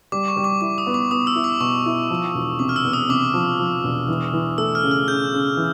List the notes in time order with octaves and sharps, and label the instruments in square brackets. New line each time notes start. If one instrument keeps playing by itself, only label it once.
[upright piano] G3 [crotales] D6
[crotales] C#6
[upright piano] G3
[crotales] D6
[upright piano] E4 [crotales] D6
[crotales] D#6
[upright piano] B3
[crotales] D6
[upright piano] B3 [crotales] D#6
[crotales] E6
[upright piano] E4
[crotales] D6
[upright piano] B2 [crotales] C#6
[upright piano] E4
F3
E1
[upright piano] C3 [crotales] D6
[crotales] F6
E6
[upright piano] E2
[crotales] D#6
[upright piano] C3 [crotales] D6
[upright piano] F3
F3
E1
E3
E3
[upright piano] A3 [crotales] E6
[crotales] F6
[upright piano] C#3
[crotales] F6
[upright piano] C#3 [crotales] G6
[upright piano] C#3
E3